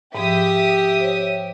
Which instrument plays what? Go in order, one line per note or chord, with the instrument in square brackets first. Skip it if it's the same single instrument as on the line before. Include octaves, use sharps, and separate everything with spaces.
[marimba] G#2 F3 [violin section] G4 E5 D#6
[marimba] C5 C#5